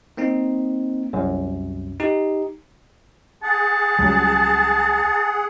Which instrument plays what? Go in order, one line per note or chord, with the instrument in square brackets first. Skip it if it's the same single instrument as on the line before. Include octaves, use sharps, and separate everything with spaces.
[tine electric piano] A#3 C4 D#4
C2 F#2
D#4 G4
[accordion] G#4 F#5 [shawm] A5
[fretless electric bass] C#2 F#3 G3